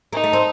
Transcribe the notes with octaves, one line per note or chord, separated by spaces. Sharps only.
A#3 D#4
A3
C4